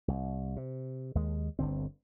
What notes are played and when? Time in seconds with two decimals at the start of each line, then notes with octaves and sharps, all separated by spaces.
0.08 C2
0.56 C3
1.15 D#2 G#3
1.59 G1 D2 D3 C4